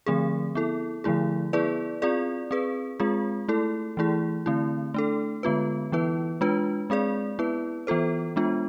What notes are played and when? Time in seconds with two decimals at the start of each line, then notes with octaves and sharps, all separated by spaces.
0.06 D3 F3 A3 C4 G#4
0.55 B3 E4 A4
1.04 D3 F3 A3 E4 G#4
1.53 B3 E4 G#4 B4 D5
2.02 C4 F4 G#4 D5
2.51 C4 G#4 B4
3.00 G#3 C4 F4 G#4
3.48 A3 E4 A4
3.97 E3 A3 E4 G#4
4.46 D3 A3 C4 E4
4.94 A3 D4 A4
5.43 D3 G#3 B3 F4 B4
5.92 E3 B3 E4 B4
6.41 G#3 D4 F4 B4
6.90 G#3 C4 G#4 D5
7.39 B3 E4 B4
7.87 E3 B3 F4 A4 C5
8.36 G#3 B3 D4 F4